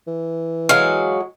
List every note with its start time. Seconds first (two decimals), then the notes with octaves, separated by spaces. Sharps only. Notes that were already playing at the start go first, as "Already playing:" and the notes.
0.07 E3
0.69 F#3 G#3 F#4 F5